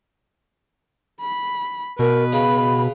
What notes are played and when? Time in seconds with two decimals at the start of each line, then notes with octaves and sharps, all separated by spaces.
1.21 B5
1.99 B2 A#4 B4
2.32 C#3 B5